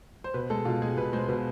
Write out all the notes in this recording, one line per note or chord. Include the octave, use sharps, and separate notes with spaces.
C5
B2 B4
G#3 A4
B2 F4
G#3 G#4
B2 B4
G#3 C5
B2 B4